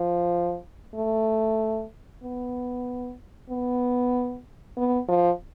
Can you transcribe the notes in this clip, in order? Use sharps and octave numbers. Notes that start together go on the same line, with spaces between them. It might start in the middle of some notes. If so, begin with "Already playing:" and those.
Already playing: F3
A3
B3
B3
B3
F3